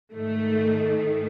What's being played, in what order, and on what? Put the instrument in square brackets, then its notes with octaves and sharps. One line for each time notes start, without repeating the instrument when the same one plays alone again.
[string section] G#2 D#3 A3
A3